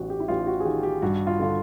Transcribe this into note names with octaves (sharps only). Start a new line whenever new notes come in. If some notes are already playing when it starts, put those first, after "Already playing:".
Already playing: A1 F#4
G4
E4
A1 F4
F#4
G#4
D#3 G4
G4
G2 F#4
F4
D3 F4